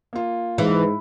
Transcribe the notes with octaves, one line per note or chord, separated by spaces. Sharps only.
A#3 F4
G#2 E3